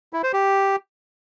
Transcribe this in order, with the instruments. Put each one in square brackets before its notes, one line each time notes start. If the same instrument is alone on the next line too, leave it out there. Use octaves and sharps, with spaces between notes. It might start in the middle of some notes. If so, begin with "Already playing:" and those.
[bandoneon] E4
C5
G4